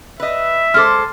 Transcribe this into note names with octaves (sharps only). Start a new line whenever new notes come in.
B4 D#5 E5
G#3 A4 C5 D6 F6